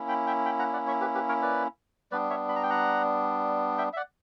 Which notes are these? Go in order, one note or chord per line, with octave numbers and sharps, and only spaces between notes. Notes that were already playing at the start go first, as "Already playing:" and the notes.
Already playing: A#3 C#4 E4
G5 B5
E5 G5
G5 B5
F#5 A#5
D5 F#5
C#5 E5
G4 B4
G4 B4
A#4 C#5
B4 D5
G3 B3 D4 B4 D5
C#5 E5
B5
A#5
G5
F#5 A#5
E5 G5
E5
D5 F#5